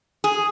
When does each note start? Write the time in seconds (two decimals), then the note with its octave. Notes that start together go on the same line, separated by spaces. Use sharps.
0.24 G#4